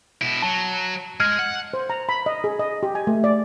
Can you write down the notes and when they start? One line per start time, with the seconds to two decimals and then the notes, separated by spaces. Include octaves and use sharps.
0.21 B2 E4
0.42 F#3 A5
1.20 G#3 F6 G#6
1.39 F#5
1.74 C5
1.90 A#5
2.09 B5
2.26 D#5
2.44 G#4
2.59 D#5
2.83 G4
2.95 G#5
3.07 A3
3.24 D5